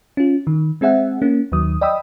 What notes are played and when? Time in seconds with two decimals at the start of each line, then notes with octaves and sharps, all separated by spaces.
0.17 C#4 F4
0.47 D#3
0.81 G#3 C4 G#4 E5 F#5
1.22 A#3 C#4
1.52 D#2 D#3 F#3 D#6
1.81 D5 D#5 G5 B5 D#6 E6